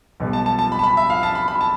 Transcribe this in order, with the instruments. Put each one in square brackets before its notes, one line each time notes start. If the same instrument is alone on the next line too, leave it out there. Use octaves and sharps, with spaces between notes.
[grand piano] B1 B2 G3
A5
A5
A5
B5
A5
B5
E5
F5
A5
B5
B5
A5